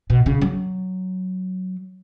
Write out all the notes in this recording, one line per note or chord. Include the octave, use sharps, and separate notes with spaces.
B2
C#3
F#3